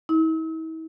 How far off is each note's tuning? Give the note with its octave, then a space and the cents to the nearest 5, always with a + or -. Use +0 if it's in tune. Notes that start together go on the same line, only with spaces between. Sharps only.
E4 -45